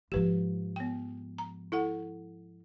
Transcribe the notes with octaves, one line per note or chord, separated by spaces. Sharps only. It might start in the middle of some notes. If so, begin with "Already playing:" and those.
G#2 F3 G4 B4
B3 G5
A#5
E4 A4 F#5